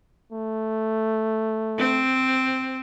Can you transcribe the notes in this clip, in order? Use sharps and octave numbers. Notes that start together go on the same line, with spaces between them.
A3
C4